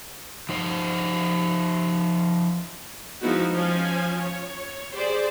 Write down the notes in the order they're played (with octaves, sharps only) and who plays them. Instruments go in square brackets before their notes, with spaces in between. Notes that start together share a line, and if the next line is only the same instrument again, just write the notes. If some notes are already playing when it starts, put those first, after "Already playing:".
[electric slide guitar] F3 D#4 C5
[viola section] F3 G#3 B3 D#4 E4 F#4
F3 C#4 G#5
C#5
G4 G#4 C5 D5